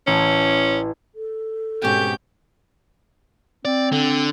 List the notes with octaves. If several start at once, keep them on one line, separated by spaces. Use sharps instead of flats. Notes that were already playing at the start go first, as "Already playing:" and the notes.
A1 C#4
A4
G#2 B2 C4 C#4 G4 G6
C4 D5
D3